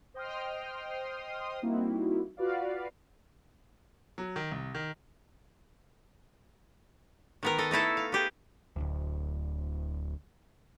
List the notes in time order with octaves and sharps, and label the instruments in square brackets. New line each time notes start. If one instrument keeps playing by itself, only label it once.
[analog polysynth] C5 D#5 G5 C6 D#6 F6
G3 A#3 C4 D#4 E4 F#4
F4 F#4 B4 D5 F5
[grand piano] F#3
D#3
C2
D#3
[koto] D#3 B3 A#4
A4 D#5
A3 D#4 E4 A4
F5
B3 G4 G#4
[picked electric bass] D1 G1 D2